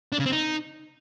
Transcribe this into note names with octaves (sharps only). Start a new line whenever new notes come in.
D4
C#3
C4
D#4